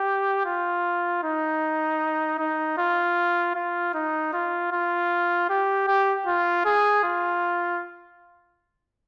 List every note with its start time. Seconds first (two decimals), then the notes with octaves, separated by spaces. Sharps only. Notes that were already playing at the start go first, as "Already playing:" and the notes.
Already playing: G4
0.46 F4
1.24 D#4
2.39 D#4
2.78 F4
3.56 F4
3.94 D#4
4.33 F4
4.72 F4
5.50 G4
5.88 G4
6.27 F4
6.65 G#4
7.04 F4